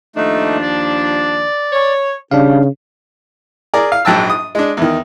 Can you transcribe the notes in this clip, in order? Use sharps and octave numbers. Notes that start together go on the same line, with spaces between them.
D#2 F3 A3 D4 D#4
D5
C#5
C#3 G3 D4 F5
G#4 A#4 D5
F5
A#1 G#2 F#3 G5 A5 E6
D#6
G#3 D4
E2 D#3